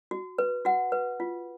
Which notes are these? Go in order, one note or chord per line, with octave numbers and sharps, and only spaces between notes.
F#4
B4
F#4 F#5
B4
F4